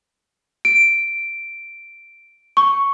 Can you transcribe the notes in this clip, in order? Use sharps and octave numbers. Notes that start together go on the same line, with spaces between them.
D7
C#6